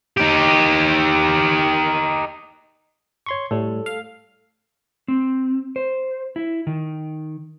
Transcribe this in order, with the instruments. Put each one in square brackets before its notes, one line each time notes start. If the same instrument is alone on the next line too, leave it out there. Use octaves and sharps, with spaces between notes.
[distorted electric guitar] D#4 G4
[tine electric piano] C#5 C6 C#6
[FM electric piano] A2 G3 [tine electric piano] A4
[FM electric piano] F5
[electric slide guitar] C4
C5
E4
D#3